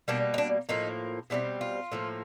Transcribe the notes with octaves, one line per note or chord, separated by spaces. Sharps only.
B2 G3 A#3 D4
D#4
D4
A2 F3 A#3 D#4
B2 G3 C4 E4
F4
A2 F3 A#3